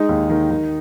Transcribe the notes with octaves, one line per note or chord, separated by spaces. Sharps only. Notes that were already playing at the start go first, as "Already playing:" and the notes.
Already playing: G#3 D#4
D#2
D#3
D#3